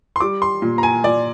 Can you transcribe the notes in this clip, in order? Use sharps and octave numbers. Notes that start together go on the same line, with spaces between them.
C6
G3 D6
C6
A#2
A#5
G#5
A#2 D5